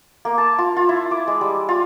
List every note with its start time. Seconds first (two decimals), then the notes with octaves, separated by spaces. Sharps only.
0.25 A#3
0.38 A5
0.58 F4
0.76 F4
0.89 E4
1.11 D6
1.27 G#3
1.41 G3
1.69 F4